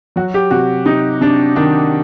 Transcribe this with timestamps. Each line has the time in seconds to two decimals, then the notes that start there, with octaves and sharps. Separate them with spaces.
0.16 F#3 F#4
0.34 G4
0.51 C3 F#4
0.86 C3 D#4
1.21 C3 D4
1.56 D#3 D4